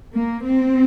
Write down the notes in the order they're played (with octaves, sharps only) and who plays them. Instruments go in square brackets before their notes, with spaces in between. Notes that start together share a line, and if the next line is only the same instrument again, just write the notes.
[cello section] A#3
C4